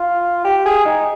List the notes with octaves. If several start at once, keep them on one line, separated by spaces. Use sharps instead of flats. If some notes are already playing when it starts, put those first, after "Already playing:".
Already playing: F4
G4
G#4
D#4